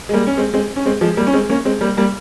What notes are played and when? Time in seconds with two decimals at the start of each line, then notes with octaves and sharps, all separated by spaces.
0.09 G#3
0.13 G3 A#3
0.27 C#4
0.37 G#3 C4
0.54 G#3 C4
0.76 C#4
0.86 G#3 C4
1.01 F3 G#3
1.17 G3 A#3
1.27 C#4
1.33 G#3 C4
1.50 A#3 C#4
1.65 G#3 C4
1.81 G3 A#3
1.97 G3 A#3